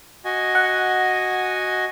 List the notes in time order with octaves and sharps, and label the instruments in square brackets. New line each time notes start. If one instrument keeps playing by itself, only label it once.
[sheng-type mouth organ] F#4 D#5 G#5
[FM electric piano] F#5